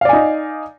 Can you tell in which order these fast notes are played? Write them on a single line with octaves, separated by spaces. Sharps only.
F5 D5 G#5 D#4